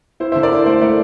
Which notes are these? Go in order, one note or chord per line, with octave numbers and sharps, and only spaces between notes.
E4 C5
C5 E5
D3
A#4 D5
E4 C5
A3 C5
A3 A#4 D5